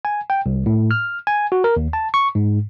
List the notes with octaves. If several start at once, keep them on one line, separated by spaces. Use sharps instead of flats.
G#5
G5
C2
A2
F6
G#5
F#4
A#4
D#2
A5
C#6
G#2